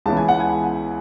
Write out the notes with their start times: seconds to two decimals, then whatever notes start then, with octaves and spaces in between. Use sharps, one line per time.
0.06 C#2 C#3 E3 B3 A5
0.17 G#5
0.29 F#5
0.40 G#5